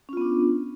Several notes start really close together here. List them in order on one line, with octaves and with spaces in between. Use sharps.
C#4 F4 B3 D4